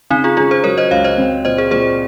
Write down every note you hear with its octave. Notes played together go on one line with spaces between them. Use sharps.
C#3 C4 D#4
F4 G#4
C#4 F4 G#4
G#4 C5
F#3 A#4 C#5
C5 D#5
C#2 C#5 F5
C5 D#5
C4
A#2 C5 D#5
G#4 C5
A#2 G#4 C5